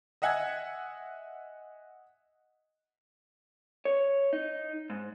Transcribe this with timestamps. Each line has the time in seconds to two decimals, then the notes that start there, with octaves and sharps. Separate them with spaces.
0.22 D#5 E5 F#5 G#5 G#6
3.85 C#5
4.33 D#4
4.90 G#2